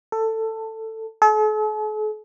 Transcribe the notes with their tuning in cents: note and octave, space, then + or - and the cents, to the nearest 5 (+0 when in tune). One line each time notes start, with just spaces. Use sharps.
A4 +15
A4 -45